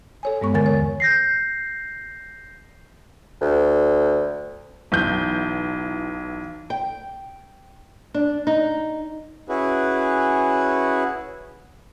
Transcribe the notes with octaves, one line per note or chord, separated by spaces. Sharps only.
A4 C#5 G#5
G2 G#3 B3 C#6
D#2 D3 E3 A#4 G#5 A6
C#5
G6 A#6 C7
D2
B1 E3 G6
G5
D4
D#4
C#4 E4 F#4 G#4 B4